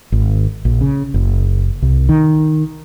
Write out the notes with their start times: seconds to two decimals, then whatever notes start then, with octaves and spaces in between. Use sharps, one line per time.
0.12 G#1
0.65 A#1
0.81 C#3
1.14 F#1
1.82 C2
2.09 D#3